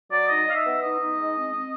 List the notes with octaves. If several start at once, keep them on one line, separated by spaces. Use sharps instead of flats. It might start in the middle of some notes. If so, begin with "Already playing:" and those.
F#3 D5
D#4 D#5
D#4 F5
E5
B3
D#4 D#5
D#4
G#3
C4
C4